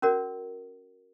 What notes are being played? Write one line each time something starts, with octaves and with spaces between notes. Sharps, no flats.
C#4 F#4 A#4 D5